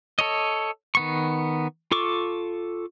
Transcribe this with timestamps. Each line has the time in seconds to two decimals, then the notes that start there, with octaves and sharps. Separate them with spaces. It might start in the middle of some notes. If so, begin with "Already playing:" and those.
0.19 A4 C#5 D#5
0.95 D#3 B3 C#6
1.92 F4 A4 C#6 D6